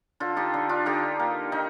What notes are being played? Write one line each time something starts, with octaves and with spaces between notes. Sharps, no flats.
D3 F4 A4
D#4 G4
D3
D4 F4
D3 D#4 G4
A#3
D#3 D#4